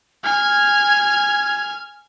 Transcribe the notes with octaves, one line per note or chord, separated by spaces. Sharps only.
G#5 F6 G#6